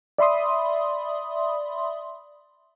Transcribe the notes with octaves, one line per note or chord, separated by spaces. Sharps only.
D5 E5 B5 C6 D#6